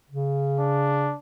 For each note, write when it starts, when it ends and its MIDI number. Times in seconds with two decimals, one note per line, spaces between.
0.10 1.13 49
0.60 1.16 62